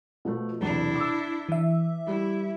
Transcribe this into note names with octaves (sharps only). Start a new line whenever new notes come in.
B2 F3 A3
B1 E2 C3 D4 E4
D6 E6
E3 E5
G3 E4